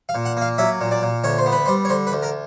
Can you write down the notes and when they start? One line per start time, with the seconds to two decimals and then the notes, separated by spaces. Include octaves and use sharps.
0.09 F5
0.15 A#2
0.25 F#5
0.37 A#3 F5
0.58 F#3 E5
0.81 A#2
0.91 D5
1.02 A#2
1.24 D2 C#5
1.38 C5
1.46 B3
1.52 B4
1.65 G3 C5
1.85 C#5
1.89 D3 C5
2.07 B4
2.12 D2
2.23 A#4